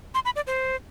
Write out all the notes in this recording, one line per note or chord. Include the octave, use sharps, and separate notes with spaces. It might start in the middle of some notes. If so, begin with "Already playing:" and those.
C6
B5
D5
C5